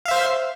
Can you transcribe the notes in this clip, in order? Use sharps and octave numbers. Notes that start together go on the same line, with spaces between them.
C5 E5 F5